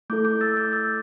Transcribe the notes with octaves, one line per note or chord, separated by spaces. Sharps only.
A3 E4 A4 D6 G6
D6 G6
E6 A6
D6 G6
E6 A6